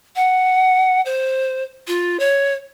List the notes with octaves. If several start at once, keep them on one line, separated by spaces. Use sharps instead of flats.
F#5
C5
F4
C#5